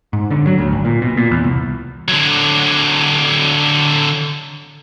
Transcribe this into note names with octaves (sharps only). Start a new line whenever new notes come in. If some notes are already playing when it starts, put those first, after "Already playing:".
G#2
D3
F#3
D2
G#1
A#2
B2
A#2
E2
C2
D3 F#3